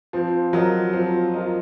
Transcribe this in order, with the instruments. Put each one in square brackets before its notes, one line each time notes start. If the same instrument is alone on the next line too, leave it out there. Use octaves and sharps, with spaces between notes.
[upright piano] F3 [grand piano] C4
[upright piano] F#3 [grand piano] F4 A#4 D#5
[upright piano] F3 [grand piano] C4
[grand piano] F4 A#4 D#5